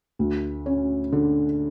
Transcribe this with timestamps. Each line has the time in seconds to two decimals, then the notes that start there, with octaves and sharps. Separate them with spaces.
0.19 D2
0.66 C#4
1.12 D3